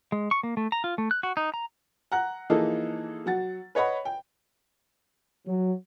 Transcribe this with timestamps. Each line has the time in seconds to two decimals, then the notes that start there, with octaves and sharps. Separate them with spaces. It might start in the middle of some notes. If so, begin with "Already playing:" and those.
0.12 G#3
0.31 C#6
0.43 A#3
0.57 A3
0.72 A#5
0.84 F4
0.98 A3
1.11 F#6
1.23 F#4
1.37 D#4
1.54 A#5
2.12 F#5 A#5 F#6
2.50 E3 F3 A#3 D#4 G#4 A4
3.26 F#3 F#5 A6
3.75 B4 C#5 D#5 F#5 B5
4.05 G5
5.47 F#3